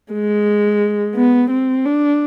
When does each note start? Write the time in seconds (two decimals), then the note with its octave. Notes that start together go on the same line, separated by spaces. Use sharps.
0.12 G#3
1.16 B3
1.50 C4
1.85 D4